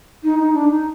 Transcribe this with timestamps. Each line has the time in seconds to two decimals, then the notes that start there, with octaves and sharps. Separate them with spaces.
0.24 D#4
0.39 D#4
0.54 D4
0.71 D#4